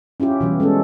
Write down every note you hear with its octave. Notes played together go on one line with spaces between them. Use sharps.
C#4 E4 F4 G4
B2 E3 G3
G#3 C#4 A4